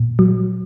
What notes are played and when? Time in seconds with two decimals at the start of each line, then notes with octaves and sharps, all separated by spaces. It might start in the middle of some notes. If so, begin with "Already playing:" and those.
Already playing: A#2
0.19 F#3